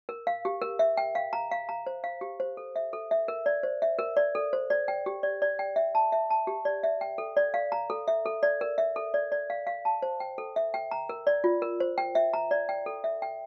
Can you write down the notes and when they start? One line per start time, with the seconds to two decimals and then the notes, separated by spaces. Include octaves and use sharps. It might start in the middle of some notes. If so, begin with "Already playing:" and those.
0.09 A#4
0.27 F5
0.45 G4
0.62 A#4
0.79 E5
0.97 G5
1.15 F5
1.33 A#5
1.51 F5
1.69 A#5
1.87 C5
2.04 F5
2.21 G4
2.40 C5
2.57 A4
2.76 E5
2.93 A4
3.11 E5
3.28 A#4
3.46 D5
3.63 C5
3.82 E5
3.99 A#4
4.17 D5
4.35 A4
4.53 C5
4.70 D5
4.88 G5
5.06 G4
5.23 D5
5.42 D5
5.59 G5
5.76 E5
5.95 A5
6.12 E5
6.30 A5
6.47 G4
6.65 D5
6.84 E5
7.01 G5
7.18 A4
7.37 D5
7.54 F5
7.72 A#5
7.90 A4
8.08 E5
8.26 A4
8.43 D5
8.61 A#4
8.78 E5
8.96 A4
9.14 D5
9.32 D5
9.50 F5
9.67 F5
9.85 A5
10.02 C5
10.20 G5
10.38 A4
10.56 E5
10.74 G5
10.91 A#5
11.09 A#4
11.27 D5
11.44 F4
11.62 A#4
11.80 C5
11.98 G5
12.15 E5
12.33 A#5
12.51 D5
12.69 G5
12.86 A4
13.04 E5
13.22 G5